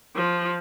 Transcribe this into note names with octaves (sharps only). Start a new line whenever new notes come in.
F3